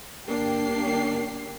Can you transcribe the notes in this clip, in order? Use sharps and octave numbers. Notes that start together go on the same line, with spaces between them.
G1 A#3 D4 G4 C7